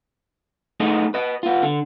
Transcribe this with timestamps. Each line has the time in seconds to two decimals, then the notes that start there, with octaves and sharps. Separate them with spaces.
0.80 A3 B3 D#4 G#4 D#5
1.14 B4 D#5
1.43 B3 F4
1.63 D3